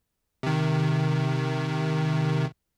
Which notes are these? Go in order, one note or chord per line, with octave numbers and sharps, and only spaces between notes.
C3 D#3